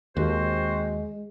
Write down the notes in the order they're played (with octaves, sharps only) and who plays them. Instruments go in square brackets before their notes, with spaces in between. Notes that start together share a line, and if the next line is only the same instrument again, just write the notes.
[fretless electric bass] D#2 [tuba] G#3 [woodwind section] C4 F#4 C5